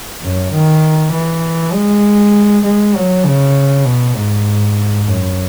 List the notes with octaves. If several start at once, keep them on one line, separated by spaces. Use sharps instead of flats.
F#2
D#3
E3
G#3
G#3
F#3
C#3
B2
G#2
F#2